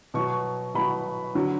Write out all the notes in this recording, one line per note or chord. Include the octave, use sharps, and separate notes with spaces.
B2 F#3 C#6
B2 F#3 B5
D3 F#3